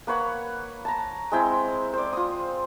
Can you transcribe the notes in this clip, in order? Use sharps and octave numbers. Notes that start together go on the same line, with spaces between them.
A#3 B4 C#5 F#5
A5 A#5
G#3 C4 E4 G5
C5 D5
F4 D#6